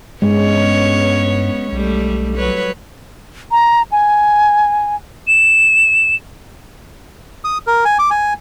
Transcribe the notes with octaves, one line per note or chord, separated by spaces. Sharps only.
G2 G#3 B3 C#4 C#5
B1 G3 A3
F#3 B4 C#5
A#5
G#5
E7
D#6
A#4
G#5
D6
G#5